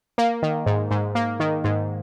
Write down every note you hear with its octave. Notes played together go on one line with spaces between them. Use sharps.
A#3
D#3
G#2
G#2
A#3
D#3
G#2